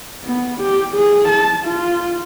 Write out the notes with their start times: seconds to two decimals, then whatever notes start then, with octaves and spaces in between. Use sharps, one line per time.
0.24 B3
0.61 G4
0.94 G#4
1.28 A5
1.65 F4